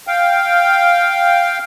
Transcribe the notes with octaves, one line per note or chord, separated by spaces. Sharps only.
F5 G5